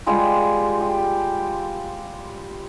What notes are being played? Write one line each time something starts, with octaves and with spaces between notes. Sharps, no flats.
G3 G#3 F4 G4
G4